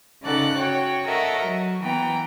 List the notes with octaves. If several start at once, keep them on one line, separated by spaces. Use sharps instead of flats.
C#3 D#4 A4 D5 F#5 F#6
F#4 C#5 G5
A4 A#4 C#5 D#5 E5 F#5
F#3
E3 B3 G5 A#5